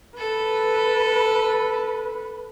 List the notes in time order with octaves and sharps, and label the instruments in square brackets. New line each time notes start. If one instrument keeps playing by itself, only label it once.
[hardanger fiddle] A4 [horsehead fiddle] B4